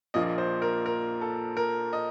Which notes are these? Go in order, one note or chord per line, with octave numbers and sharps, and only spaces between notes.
A#1 A#2 F3 A#3 D#5
C5
A#4
A#4
A4
A#4
D#5